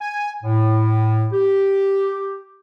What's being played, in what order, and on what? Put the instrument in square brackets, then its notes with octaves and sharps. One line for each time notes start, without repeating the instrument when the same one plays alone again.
[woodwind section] G#5
A2
G4